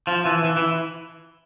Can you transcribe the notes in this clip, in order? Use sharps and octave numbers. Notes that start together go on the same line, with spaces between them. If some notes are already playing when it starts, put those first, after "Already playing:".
F3
E3
E3
E3